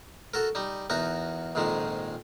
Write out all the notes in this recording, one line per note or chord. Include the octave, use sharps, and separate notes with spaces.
F#4 A4 A#4
G3 D#4
E2 D#4 F#4 A#4
A#1 F2 G#2 D#3 G#3